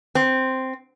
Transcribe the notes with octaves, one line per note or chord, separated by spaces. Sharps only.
C4